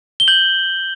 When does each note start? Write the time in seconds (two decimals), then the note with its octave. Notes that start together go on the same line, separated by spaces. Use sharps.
0.20 G7
0.28 G6 F#7